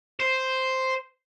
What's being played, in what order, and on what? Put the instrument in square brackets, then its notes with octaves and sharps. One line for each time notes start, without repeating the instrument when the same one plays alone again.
[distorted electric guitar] C5